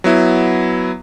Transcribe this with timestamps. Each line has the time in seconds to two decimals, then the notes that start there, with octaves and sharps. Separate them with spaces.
0.04 F#3 B3 E4